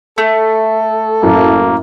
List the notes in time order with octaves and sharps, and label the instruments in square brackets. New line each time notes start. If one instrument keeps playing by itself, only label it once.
[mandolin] A3 [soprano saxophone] A4
[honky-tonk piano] F#2 A2 [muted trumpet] A#3